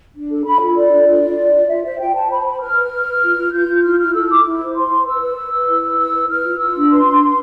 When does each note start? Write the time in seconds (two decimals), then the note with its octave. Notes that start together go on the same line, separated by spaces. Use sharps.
0.15 D4
0.30 A4
0.45 A4 B5
0.61 F4
0.76 A4 D5
0.91 D4
1.07 F4
1.22 F4
1.38 F4
1.53 F4
1.68 F4 E5
1.83 C5 E5
1.99 F4 G5
2.14 C5 A5
2.30 C5 B5
2.40 A5
2.45 C5 B5
2.60 B4 F6
2.76 B4
2.91 B4
3.06 B4
3.22 F4
3.37 F4
3.52 F4 G6
3.67 F4
3.83 E4 F6
3.98 E4 F6
4.14 A4 E6
4.29 E4 D6
4.45 E4
4.60 C5
4.75 E4 C6
4.90 C5
5.06 B4 E6
5.21 B4
5.36 B4
5.52 B4
5.67 E4
5.82 B4
5.98 E4 E6
6.14 B4
6.29 B4 F6
6.44 F4
6.59 F4 E6
6.75 D4
6.90 B4 C6
7.05 D4
7.20 B4